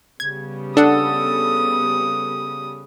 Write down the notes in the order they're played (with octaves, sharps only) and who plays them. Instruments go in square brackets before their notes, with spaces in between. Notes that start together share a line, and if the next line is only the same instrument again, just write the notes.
[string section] C#3 G3 B3 [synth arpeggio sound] G#6
[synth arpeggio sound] D4 F#5 [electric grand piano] A4 [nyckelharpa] D#6